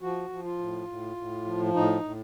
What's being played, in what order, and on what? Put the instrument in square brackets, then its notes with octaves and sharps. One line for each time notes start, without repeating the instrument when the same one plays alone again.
[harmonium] F3 F#4
F3
F4
A2
A2
A2
F3
A2 D#4
A2